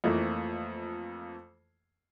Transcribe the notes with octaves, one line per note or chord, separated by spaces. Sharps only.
F2 E3 F3 A3 A#3